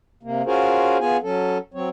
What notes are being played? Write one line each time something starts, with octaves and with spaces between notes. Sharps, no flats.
C3 A#3
C#4 F4 F#4 G#4 A#4 C5
B3 F4 G#4 G#5
F#3 C#4 A4
F#3 C4 C#5